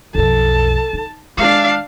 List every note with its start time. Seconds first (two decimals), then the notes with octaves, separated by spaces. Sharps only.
0.15 B1 F2 A4 A5
0.93 D#4
1.37 D#3 G#3 D4 F5